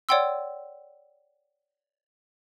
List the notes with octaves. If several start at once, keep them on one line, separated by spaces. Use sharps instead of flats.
C#5 D5 F#5 G5 C6 E6